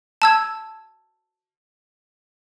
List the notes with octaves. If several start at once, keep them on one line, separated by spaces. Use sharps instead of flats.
A5 E6 G#6